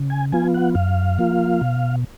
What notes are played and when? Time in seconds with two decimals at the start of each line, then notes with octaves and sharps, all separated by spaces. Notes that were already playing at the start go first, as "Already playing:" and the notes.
Already playing: C#3
0.10 G#5
0.32 F3 B3 F4 G#5
0.54 F#5
0.75 F#2 F5
1.18 F3 A#3 F4
1.61 B2